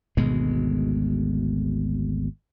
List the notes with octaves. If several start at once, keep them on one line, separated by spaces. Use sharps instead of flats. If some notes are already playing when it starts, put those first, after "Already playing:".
G#1 D2 B2 G#3